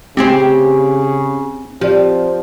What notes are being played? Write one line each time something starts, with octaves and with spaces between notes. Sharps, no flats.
C#3 C4 G4 G#4 C5
F3 C4 G4 D5